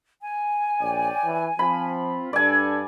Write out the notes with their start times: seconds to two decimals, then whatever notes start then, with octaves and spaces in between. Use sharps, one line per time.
0.22 G#5
0.80 A#1 C#5 D5 G5
1.24 E3
1.59 F3 C4 F4 B5
2.33 G2 D4 A4 D5 G#5